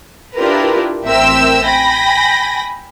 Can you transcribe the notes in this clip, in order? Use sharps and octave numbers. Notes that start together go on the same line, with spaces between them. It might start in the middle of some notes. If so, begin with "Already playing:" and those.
D4 E4 F4 G4 A#4 B4
A1 C4 A#4 E5 G5 E6
G5 G#5 B5 A#6